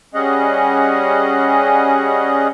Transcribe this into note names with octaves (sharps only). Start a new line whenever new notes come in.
G3 C#4 G#4 D#5 F#5